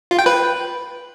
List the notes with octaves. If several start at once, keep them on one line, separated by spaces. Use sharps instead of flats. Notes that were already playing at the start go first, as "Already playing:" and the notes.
F4
G5
B4